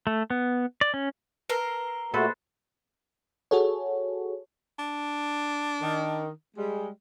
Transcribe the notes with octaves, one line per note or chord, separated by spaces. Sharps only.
A3
B3
D5
C#4
A#4 B4 C7 G7
A#2 A3 A#3 F#4 A4 B4 C5
F#4 G#4 A4 C#5
D4
D#3
G3 G#3